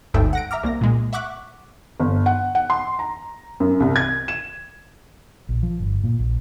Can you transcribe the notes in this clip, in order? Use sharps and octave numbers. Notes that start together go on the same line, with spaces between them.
G1 D2 G#2 A4 E5 G5
F#5 A#6 D7
E5 A#5 D6 F6
C2 A#3 A#6
A#2 G#3 A#3
E5 F#5 C#6 D6 F#6 B6
G1
F#5
F#5
C6
A#5
F#2
C2
G#6
E7
A#1
F3
G1
A#2
A#1